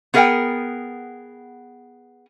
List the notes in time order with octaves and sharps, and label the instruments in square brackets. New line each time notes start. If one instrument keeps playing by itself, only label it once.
[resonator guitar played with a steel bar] B3 G#4 A#4 D#5 F#5 G5